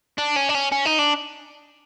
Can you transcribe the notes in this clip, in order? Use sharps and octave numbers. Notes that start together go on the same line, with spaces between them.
D4
C#4
D4
C#4
C#4
D#4
D4